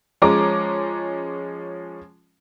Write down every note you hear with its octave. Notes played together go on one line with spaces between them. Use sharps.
F3 G#3 C#4 A#5 D6